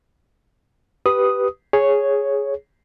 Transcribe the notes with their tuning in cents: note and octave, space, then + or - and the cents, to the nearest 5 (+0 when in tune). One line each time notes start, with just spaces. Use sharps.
G4 -10 B4 +0 D#6 +0
G#4 +0 C#5 +0